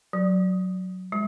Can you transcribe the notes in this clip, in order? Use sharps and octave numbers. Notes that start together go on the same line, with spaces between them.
F#3
G#3